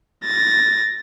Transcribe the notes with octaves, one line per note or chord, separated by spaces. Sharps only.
A6 A#6